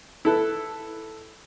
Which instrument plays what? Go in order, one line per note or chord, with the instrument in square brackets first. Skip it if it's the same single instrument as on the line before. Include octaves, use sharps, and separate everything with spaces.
[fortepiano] E4 A4 B4